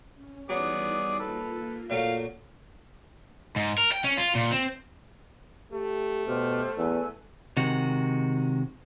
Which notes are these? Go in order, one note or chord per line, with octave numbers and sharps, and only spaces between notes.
C#4
E3 F#3 G3 B3 D#4 G#4 D5
A#3 F4 A4 B4
A#2 F#3 A3 F5
G#2
A#4
G5
C#4
F4
A#2
C4
A3 G4
B2 G4 C5 F6
E2 B4 G#5 E6
C3 D#3 G#3 F#4